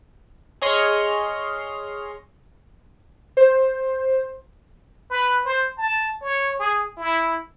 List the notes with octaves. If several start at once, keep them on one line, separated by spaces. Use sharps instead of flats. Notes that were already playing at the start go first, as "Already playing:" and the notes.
G#4 C#5 D#5 C6 C#6 F6
C5
B4
C5
A5
C#5
G#4
E4